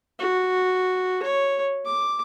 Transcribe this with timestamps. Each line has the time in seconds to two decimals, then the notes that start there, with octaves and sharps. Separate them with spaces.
0.19 F#4
1.23 C#5
1.86 D6